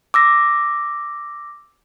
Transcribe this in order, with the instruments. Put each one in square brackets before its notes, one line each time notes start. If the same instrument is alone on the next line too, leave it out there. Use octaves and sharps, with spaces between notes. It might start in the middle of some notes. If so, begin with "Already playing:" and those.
[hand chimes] D6 E6 A#6